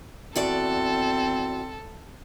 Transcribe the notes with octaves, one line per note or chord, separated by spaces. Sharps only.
E2 C4 F#4 A4 D5